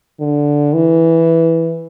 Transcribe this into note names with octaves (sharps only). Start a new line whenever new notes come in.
D3
E3